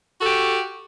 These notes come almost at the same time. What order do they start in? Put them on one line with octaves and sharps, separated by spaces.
F#4 A4 G4